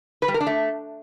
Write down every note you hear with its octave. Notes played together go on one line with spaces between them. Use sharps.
B4
G3
A#4
D4
A3